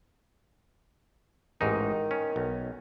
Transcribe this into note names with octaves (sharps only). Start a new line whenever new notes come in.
A1 G#2 D#3 D#4
C#4
B1